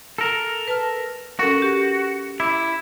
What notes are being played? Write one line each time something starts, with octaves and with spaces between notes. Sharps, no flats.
A4 A#4
B4 A5 F6
C#4 F#4 A4 A#4
G4
E4 D6